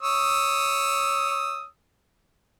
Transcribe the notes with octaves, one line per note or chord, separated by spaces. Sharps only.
C#5 D#6 E6